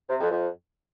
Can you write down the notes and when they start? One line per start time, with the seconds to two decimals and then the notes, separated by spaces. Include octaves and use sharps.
0.09 C3
0.20 F2
0.31 F2